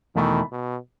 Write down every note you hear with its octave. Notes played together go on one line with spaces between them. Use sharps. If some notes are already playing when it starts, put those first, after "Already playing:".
E2 B2 D#3 A3 E4
B2